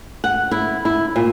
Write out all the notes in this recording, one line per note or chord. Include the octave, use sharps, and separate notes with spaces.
F#5
E4
E4
A#2